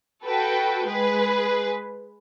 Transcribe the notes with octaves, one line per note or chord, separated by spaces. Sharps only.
F#4 A4 B4 G5
G#3 G#4 B4